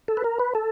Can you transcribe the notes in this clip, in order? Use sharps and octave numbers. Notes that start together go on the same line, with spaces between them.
A4
B4
A#4
B4
A4